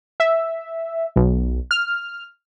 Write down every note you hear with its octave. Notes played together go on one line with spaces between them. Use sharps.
E5
B1
F6